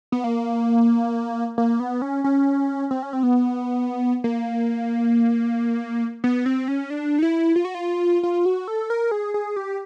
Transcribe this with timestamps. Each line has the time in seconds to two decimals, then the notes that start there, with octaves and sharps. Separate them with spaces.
0.12 B3
0.24 A#3
1.58 A#3
1.80 B3
2.02 C#4
2.24 C#4
2.91 C4
3.03 C#4
3.13 C4
3.23 B3
4.24 A#3
6.24 B3
6.46 C4
6.68 C#4
6.90 D4
7.19 D#4
7.23 E4
7.56 F4
7.65 F#4
7.75 F4
8.23 F4
8.46 F#4
8.68 A4
8.90 A#4
9.11 G#4
9.34 G#4
9.56 G4